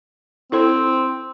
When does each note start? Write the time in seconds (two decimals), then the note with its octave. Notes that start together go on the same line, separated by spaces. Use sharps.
0.52 C4 E4 A4 C5